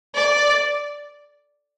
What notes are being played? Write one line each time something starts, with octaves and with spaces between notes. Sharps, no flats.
D5